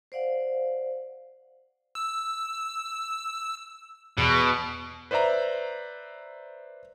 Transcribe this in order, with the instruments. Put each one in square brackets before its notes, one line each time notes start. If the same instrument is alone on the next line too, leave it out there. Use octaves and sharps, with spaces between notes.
[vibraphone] C5 D5 F5 F#5
[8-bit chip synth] E6
[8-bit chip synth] E2 [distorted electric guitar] B2
[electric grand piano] B4 C5 D5 E5 A#5